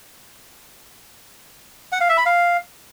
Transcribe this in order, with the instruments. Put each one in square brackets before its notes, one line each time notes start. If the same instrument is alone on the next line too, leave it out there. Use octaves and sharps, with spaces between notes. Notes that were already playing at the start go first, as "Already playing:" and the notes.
[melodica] F#5
F5
E5
B5
F5